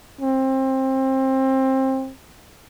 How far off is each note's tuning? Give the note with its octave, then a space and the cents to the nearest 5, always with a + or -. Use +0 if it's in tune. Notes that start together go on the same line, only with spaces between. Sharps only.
C4 +20